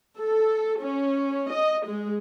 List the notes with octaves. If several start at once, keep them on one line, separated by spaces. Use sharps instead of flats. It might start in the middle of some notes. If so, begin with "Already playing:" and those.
A4
C#4
D#5
G#3